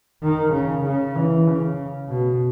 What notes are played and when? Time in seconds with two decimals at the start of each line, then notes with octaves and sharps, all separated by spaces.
0.23 D#3
0.54 C#3
0.85 C#3
1.16 E3
1.47 C#3
2.09 B2